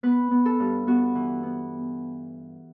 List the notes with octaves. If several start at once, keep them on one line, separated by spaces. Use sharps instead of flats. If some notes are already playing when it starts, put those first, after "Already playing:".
B3 B4
B3
A4
G2
B3 F#4
E3
B3